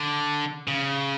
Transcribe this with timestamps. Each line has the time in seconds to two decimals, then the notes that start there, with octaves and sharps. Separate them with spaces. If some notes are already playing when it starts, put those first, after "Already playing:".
Already playing: D3
0.68 C#3